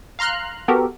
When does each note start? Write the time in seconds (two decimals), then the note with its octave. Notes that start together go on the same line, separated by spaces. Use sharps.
0.19 F5 A#5 C6 F6 F#6
0.68 B3 F#4 G4 A4 A#4